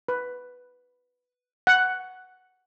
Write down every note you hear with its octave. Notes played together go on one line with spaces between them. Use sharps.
B4
F#5